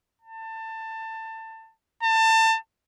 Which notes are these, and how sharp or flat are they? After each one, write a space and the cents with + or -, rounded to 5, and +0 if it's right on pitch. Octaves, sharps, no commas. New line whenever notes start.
A5 +25
A5 +25